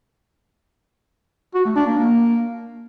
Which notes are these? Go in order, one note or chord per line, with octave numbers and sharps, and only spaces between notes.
F#4
A3
D4
A#3
A#3